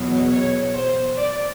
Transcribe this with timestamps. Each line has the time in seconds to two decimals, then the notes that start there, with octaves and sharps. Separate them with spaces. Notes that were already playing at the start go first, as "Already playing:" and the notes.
Already playing: E2 B2 F#3
0.30 C#5
0.74 C5
1.18 D5